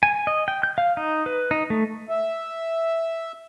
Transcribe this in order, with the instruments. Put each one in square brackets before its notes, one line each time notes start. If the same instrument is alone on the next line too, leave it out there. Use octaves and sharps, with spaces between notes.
[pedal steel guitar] G#5
D#5
G5
G6
F5
D#4
B4
D#4
A3
[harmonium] E5